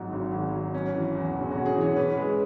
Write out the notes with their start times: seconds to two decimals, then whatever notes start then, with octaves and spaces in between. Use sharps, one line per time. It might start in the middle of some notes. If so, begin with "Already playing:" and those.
Already playing: G#1 G#2 F#3
0.13 G#1
0.32 G#1
0.53 F#3
0.74 C#4
0.94 E3
1.15 E2
1.36 E1
1.51 C#4 F#4
1.66 G#4
1.76 E3
1.81 C#5
1.97 C#4 B4
2.17 G#3 G#4